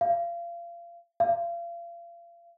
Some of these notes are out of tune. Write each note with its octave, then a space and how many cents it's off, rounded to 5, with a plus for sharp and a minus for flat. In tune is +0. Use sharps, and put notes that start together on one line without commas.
F5 -30
F5 -35